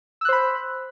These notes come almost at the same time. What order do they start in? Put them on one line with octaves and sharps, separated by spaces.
E6 F#6 C5 B5